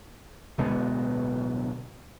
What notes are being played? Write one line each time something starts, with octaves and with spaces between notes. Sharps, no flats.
D1 B2 G#3 B3